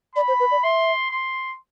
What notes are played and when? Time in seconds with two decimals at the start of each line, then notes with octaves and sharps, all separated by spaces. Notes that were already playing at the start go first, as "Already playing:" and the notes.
0.16 D5 B5
0.28 C5
0.40 B4
0.51 D5
0.63 E5 C6
1.11 C6